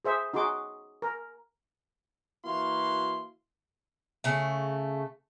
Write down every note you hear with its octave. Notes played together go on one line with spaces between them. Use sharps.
G#4 C5 E5
D#4 F#4 G#4 C6 D6
A#4
E3 A#3 E4 F#4 F5 C6
C#3 A3